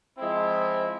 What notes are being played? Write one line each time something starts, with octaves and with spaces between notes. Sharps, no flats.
F3 G#3 C4 E4